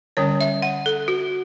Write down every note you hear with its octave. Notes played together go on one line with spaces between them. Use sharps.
D3 G3 C#4 C#5
E5
F#5
A4
F#4